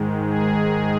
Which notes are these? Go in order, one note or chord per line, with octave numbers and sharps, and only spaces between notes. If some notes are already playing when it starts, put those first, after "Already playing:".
Already playing: G#2 D#3 G#3
G#4